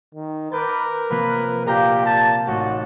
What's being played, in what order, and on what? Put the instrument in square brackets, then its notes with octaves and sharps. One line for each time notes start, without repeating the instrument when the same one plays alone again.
[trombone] D#3
[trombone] A#4 [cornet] B4 [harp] D6 G6 A6
[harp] C3 F3 A#3 [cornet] B4
[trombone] A#2 [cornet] G4 [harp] F5 A#5 G6
[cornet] A5
[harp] A1 D#4 [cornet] F#4